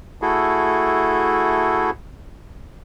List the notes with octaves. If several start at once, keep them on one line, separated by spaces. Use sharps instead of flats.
A3 E4 F#4 G#4 A4